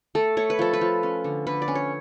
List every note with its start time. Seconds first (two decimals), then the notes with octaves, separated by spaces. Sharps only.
0.15 A3 A4
0.37 A3 C#5
0.50 B4
0.59 F3 A4
0.74 B4
0.81 F3
1.03 C#4
1.24 D3
1.47 D3 B4
1.62 D5
1.68 C#4
1.75 C#5